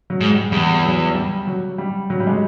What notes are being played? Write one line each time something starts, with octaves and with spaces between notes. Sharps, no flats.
F#3
G#2
G3
E2 G3
F#3
G3
F#3
G3
F#3
G3
G#3